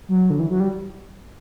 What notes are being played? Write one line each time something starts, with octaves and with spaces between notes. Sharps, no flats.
F#3
D3
E3
F#3
G3